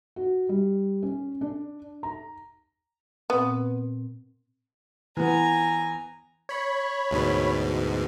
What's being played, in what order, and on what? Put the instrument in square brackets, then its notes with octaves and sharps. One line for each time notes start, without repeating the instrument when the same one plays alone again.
[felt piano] F#4
G3
C#4
D4
A#5
[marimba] A#2 C4 [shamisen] B3
[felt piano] E3 B3 [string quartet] G#5 A#5
[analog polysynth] C#5 B5
[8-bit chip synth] D2 G#2 B2